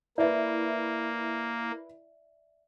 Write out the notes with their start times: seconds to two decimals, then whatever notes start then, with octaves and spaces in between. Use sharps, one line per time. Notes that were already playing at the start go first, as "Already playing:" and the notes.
0.18 A#3 E4 B4 D5 E5